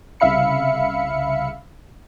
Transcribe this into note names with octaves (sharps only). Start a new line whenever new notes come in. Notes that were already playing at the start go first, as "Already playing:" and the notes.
C2 C#3 E5 F5 B5 C#7